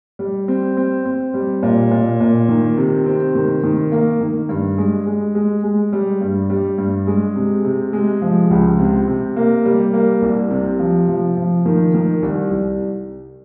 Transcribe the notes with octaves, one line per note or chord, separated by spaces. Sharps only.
G3
C4
C4
C4
G3
A#2
A#2
A#2
D#3
C3
C4
D#3
D#3
A#3
D#3
G2
G#3
G#3
G#3
G#3
G3
G2
G3
G2
G#3
C3
C3
G#3
F3
C#2
C3
C3
A#3
G3
A#3
C2
C3
F3
F3
F3
D#3
D#3
C2
C2